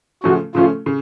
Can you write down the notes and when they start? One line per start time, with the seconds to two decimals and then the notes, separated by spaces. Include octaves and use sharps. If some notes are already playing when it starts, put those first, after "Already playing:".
0.24 C#3 F3 A3 C#4 F#4
0.55 C#3 F3 A3 C#4 F4
0.86 C#3